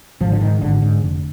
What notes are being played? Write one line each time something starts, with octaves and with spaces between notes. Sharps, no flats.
G#1 F3
D3
G#2 D#3
G#1 D3
G#2
F1